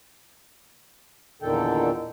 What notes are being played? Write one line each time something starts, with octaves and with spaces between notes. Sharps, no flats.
E2 A#2 D3 D#3 A4 G5